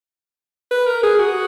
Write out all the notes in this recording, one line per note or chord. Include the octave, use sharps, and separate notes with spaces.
B4
A#4
G#4
F#4